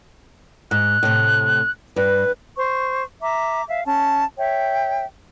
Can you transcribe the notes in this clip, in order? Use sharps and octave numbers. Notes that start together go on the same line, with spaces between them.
G#2 F#6
A2 C3
G2 B4
C5 C#6
E5 A#5 D6
E5 F5
C#4 A5
C#5 E5 G5